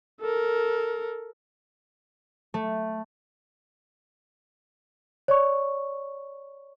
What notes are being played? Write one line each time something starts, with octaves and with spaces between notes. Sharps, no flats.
A4 A#4
A3
C#5 D5 C#6